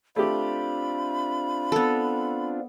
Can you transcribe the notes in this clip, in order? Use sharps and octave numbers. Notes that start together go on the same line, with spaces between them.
A3 C4 D4 F4 G4 B5
B3 A4